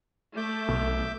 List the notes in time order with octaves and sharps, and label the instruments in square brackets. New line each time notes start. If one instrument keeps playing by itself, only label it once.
[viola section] A3 [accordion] E5 D6 G6
[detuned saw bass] B1